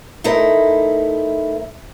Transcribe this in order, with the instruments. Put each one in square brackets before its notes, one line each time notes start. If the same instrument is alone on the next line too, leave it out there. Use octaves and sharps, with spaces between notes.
[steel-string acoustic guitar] A3 D#4 E4 A#4 C5